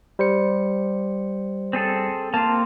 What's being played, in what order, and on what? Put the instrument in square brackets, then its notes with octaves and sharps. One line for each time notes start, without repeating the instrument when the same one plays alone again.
[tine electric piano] G3 C5 C#7
[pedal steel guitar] C4 G#4 A4
[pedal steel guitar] A#3 C4 F4 [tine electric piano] A5